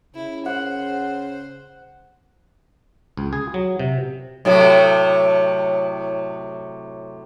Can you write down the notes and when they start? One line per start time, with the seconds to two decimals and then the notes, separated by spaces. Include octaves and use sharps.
0.15 C#3 E4
0.46 C5 F#5
3.17 C#2
3.33 G#4
3.54 F#3
3.79 C3
4.45 A2 C3 F#3